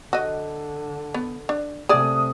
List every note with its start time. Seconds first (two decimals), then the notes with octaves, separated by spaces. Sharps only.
0.13 D3 F#4 D#5
1.14 B3
1.49 D4
1.89 C3 A3 G#4 D5 D#6